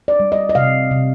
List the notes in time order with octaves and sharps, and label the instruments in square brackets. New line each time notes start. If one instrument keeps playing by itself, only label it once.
[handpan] D5
G3
D#5
D#5
C3 F5
C3